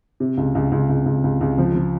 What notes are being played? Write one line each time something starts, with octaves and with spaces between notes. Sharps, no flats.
C3
C#2
C#2
C#2
C#2
C#2
C#2
C#2
F3
F3